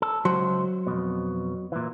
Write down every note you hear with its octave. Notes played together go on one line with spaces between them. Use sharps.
A4
C#2 F#3 C5
F2 B2
A#2 E3